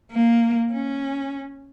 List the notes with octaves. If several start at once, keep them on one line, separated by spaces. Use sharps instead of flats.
A#3
C#4